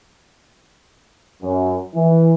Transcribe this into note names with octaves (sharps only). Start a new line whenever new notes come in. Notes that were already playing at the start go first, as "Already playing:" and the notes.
F#2
E3